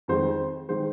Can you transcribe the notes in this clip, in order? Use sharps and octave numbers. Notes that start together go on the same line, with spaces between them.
F2 D#3 G#3 C5
D#3 G#3 C5